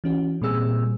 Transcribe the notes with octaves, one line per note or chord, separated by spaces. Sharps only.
E3 C#4 F#4
A#2 G3 C4 G#4 E6